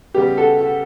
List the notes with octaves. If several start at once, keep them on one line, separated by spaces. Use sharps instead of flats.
C#3 G3 B3 G4
F#4 A4
F#4